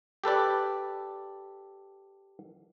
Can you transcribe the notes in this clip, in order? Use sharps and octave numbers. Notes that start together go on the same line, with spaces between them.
G4 A4 B4 D5